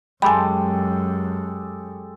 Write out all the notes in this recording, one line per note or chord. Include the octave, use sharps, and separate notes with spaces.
F#2 G#3 G4 A4 G5 G#5 B5